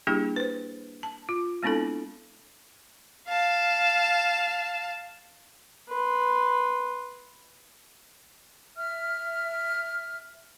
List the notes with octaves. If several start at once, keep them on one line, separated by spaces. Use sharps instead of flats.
G3 A#3 D4 E4 G4 G#4
B4 C5
A5
F4
G#3 B3 C4 D4 E4 A4
F5 A5
B4 C6
E5 F6